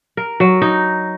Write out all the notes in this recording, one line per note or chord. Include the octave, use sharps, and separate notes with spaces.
A#4
F#3
D#4